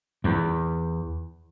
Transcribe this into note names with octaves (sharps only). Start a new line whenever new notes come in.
E2